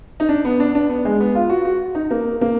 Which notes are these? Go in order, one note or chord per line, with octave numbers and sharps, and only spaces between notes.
D#4
D4
B3
D4
D4
B3
G#3
B3
F4
F#4
F#4
D#4
A#3
A#3